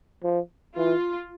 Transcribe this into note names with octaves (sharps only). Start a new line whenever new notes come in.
F3
E3 F4